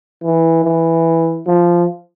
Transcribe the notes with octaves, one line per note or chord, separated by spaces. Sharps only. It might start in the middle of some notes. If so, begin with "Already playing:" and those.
E3
E3
F3